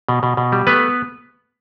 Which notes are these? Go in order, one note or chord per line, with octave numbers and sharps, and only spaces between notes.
B2
B2
B2
G3
A3 B3 B4